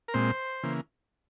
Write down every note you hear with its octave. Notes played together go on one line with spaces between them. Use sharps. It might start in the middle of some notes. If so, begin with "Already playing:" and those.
A#4
A#2 G#3 C4 C5
C#3 E3 A#3